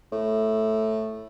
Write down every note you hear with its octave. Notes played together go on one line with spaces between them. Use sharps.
A2